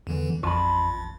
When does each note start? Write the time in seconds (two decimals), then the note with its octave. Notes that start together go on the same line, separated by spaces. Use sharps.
0.07 E2 D3 E3
0.43 A1 F2 F4 A5 B5